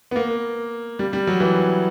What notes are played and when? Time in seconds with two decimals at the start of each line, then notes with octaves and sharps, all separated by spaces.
0.11 B3
0.16 A#3
0.99 G3
1.13 G3
1.27 F#3
1.40 E3